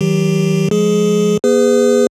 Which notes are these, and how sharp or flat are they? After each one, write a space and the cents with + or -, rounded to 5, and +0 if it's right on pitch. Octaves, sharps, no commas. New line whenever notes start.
D#3 +35 F#3 +15 G4 +0
F3 +0 G#3 +0 G#4 +15
A#3 +40 G#4 -10 B4 +40